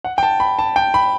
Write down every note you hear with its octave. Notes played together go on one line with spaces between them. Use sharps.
F#5
G5
A5
B5
A5
G5
B5